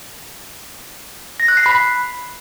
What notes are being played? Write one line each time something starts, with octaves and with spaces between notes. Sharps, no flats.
A#6
F#6
C7
B5